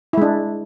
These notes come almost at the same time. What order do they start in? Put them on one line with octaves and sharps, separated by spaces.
E4 G#3 D4